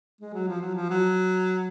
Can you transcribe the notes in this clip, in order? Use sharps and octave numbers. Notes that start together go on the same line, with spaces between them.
G#3
F#3
F3
F#3
F3
F#3